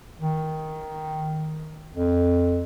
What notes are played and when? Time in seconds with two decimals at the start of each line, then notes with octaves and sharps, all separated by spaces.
0.20 D#3
1.94 F2